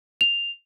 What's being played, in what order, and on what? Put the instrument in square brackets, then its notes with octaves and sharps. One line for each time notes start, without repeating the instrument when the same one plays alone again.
[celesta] F7